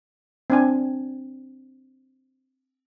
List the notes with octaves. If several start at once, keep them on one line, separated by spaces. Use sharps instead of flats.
C4 D4 G#5